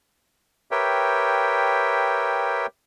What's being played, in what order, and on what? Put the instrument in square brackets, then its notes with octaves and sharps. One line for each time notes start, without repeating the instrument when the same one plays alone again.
[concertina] G4 A#4 B4 C#5 E5 G5